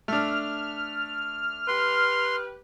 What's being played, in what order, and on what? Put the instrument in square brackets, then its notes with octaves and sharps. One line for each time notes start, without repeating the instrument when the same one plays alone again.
[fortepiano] A3 D4 [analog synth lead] F6
[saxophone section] G4 B4 [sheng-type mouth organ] C6